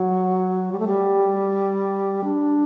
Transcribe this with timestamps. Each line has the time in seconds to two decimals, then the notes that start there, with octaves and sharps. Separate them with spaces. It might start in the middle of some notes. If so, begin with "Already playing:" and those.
Already playing: F#3
0.72 G3
0.79 A3
0.88 G3
2.24 D4